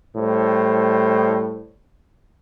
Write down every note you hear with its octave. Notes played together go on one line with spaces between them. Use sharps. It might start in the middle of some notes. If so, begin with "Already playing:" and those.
A2 G3 C5